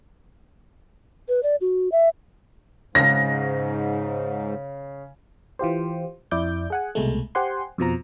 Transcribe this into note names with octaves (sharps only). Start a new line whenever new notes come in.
B4
D5
F#4
E5
G#2 C#3 A#6
E3 F4 G4 C5
F2 E4 D5 D6 G6
G#4 F#5 G#5
C2 B2 G#3 A3
G4 C5 F#5 G#5 C6
F2 B2 F3 A#5